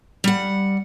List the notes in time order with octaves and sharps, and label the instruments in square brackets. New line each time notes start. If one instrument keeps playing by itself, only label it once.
[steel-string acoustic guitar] G3 F#5